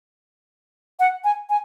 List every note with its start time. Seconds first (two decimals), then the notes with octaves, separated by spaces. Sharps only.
1.00 F#5
1.24 G#5
1.50 G#5